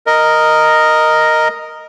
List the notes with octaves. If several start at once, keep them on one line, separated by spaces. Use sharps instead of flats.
A#4 D#5